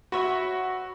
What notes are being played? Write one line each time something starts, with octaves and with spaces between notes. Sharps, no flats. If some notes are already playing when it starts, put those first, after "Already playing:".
F#4 B4 C#5 E5